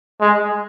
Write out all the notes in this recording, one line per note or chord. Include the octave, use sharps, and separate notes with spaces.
G#3